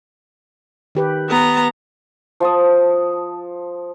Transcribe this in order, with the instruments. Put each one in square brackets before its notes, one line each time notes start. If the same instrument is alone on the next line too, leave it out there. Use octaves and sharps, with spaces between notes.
[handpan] D#3 G4 B4
[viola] B3 A#5
[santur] F3 A5 D#6